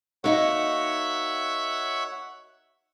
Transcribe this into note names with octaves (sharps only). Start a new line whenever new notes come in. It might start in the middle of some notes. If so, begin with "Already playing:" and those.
A#3 D#4 F#4 C#5 E5 F#5